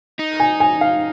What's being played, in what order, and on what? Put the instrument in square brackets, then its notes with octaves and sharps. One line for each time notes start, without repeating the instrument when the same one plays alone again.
[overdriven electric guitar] D#4
[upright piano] G#5
G#5
F5